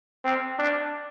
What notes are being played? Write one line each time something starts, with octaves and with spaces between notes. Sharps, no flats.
C4
D4